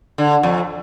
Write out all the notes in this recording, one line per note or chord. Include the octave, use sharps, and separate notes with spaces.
D3
F2